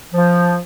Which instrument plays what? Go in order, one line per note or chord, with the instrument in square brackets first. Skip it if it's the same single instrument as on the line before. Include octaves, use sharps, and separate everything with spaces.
[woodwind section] F3